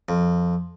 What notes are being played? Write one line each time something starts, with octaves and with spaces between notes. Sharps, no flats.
F2